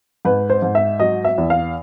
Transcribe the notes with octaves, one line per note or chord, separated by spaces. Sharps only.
G#2 B4
C5
G#2
E5
F#3 D#5
E5
E2
F5